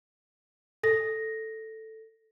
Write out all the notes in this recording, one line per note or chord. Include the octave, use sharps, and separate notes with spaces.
A4 A#6